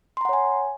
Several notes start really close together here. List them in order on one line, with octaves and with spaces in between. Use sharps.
C6 A#5 F#5 C#5 G#5